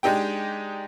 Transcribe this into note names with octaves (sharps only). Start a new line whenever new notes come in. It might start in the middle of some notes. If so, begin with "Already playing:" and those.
G#3 D4 D#4 G4 G5